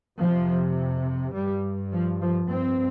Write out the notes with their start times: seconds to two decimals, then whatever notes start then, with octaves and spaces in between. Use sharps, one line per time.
0.18 F2 C3 F3
1.33 G2 G3
1.92 F3
2.21 F3
2.49 G2 C4